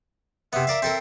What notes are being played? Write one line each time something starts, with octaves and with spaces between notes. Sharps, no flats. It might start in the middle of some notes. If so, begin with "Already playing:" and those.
C3 B3 E5
A#4 D5 F5
C4 A4 A#4